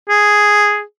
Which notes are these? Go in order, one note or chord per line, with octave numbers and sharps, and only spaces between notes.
G#4